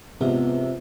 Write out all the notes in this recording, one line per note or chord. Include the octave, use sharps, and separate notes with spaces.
E2 G#2 C3 F3 B3